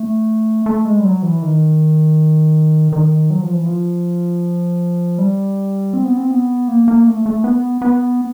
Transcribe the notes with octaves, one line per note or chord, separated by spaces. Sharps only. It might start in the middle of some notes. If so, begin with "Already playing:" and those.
Already playing: A3
A3
G#3
G3
F#3
E3
D#3
D#3
F#3
F3
E3
F3
G3
C4
B3
C4
B3
A#3
A#3
A3
A3
B3
B3